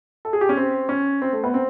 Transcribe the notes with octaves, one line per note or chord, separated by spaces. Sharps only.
A4
G#4
G4
C#4
C4
C#4
C4
A3
B3
C4